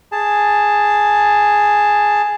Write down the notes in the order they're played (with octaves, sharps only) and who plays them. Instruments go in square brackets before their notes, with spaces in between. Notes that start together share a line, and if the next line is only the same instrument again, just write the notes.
[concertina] G#4 A5